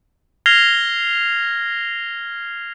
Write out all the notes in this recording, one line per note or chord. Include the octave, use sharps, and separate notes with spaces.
F6 G#6 A#6 C7 F7 G7